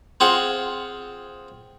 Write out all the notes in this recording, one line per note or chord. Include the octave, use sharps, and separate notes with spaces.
C4 F4 G#4 F#5